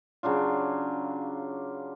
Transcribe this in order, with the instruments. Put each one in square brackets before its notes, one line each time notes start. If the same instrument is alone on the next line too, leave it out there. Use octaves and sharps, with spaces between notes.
[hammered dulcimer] C#3 F#3 D4 F4